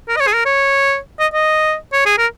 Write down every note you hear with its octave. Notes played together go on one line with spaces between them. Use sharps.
A#4
D#5
C#5
G#4
A#4
C#5
D#5
D#5
C#5
G#4
A#4